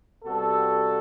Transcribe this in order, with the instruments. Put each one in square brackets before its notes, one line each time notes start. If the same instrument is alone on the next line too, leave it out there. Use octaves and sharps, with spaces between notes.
[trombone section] C3 G3 B3 F#4 A4